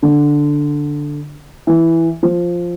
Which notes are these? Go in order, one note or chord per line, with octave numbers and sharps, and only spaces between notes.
D3
E3
F3